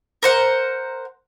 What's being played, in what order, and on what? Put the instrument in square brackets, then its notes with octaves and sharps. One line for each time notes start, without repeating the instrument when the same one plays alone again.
[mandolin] A#4 C5 F#5